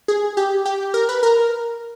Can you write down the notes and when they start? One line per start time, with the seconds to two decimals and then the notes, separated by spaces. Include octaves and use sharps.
0.08 G#4
0.37 G4
0.65 G4
0.94 A#4
1.09 B4
1.23 A#4